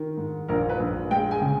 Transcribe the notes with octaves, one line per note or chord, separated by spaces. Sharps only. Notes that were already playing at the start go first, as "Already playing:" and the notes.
Already playing: D#3
G#2
A#1 A#4
B4
A#1
G#3 G5
G#5
C#3